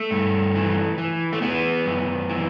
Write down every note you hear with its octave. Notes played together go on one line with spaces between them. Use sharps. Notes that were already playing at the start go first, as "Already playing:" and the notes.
Already playing: A3
G2
E3
E3
A3
E3 B3
F#2
E3